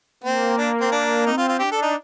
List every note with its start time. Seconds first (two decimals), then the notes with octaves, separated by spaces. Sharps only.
0.23 A#3 C4
0.58 D4
0.81 C4
0.92 D4
1.26 C4 D#4
1.38 F4
1.48 F4
1.59 D4 G4
1.72 A4
1.82 D#4